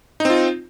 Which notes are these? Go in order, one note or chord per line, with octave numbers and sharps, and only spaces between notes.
C4 D#4 F4